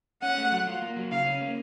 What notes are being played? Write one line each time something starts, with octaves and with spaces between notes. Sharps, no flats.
C#4 F#5
A3
F#3
F4
A#3
F#3
C#3 F5
C#4
A#3